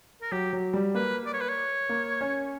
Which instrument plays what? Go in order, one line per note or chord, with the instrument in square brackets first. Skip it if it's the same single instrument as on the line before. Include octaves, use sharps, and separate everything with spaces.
[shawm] A#4
[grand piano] F#3 [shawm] G4
[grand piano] F#3
G3
[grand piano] A#3 [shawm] B4
[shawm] D5
C#5
B4
C#5
[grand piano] A#3
C#4